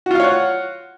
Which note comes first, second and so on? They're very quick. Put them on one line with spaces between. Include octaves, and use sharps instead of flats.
F#4 F4 F5 C#5 F#5